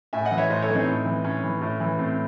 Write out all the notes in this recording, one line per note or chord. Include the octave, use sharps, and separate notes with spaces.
A2 E5 G#5
D#5 F#5
E3
C#5 E5
A2 C5 D#5
A4 C#5
E3
C4 D#4
A2
E3
A2 C#4
E3
A2
E3
A2 C4